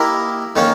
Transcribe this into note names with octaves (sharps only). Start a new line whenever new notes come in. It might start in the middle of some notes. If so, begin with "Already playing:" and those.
Already playing: A#3 E4 G4 A#4 D#5
D#3 A#3 C#4